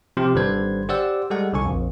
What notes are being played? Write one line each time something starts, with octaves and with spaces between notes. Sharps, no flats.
C3 F3 C4 G4
G#1 D3 G3 B4 C5 G#6
G4 C5 D5 F#5 E6
G3 G#3 A4 F#5
C2 D3 G#5 C#6
A#1 F2